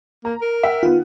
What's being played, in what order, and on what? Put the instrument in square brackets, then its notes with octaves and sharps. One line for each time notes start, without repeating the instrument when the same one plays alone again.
[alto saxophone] A#3 [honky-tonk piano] A#5
[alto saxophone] A#4
[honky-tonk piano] E5 F#5 G5
[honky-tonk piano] D#3 B3 [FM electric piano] F4